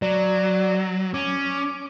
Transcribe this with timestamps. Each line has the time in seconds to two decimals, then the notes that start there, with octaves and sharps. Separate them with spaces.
0.02 F#3 D5
1.14 C#4 D6